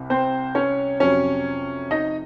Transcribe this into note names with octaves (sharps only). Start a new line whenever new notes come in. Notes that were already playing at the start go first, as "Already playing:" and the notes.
Already playing: C2 C3
C4 C5
C#4 C#5
F2 C3 F#3 C#4 C#5
D#4 D#5